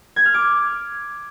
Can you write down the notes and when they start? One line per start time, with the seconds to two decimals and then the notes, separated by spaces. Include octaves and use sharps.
0.16 G#6
0.25 F6
0.34 D6